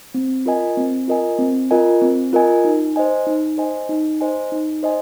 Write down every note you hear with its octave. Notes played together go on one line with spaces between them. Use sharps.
C4
F4 A#4 D#5 G#5
C4
F4 A#4 D#5 G#5
C4
F4 A#4 D#5 G#5
C4
F4 A#4 D#5 G#5
D#4
C5 D#5 G#5
D#4
C5 D#5 G#5
D#4
C5 D#5 G#5
D#4
C5 D#5 G#5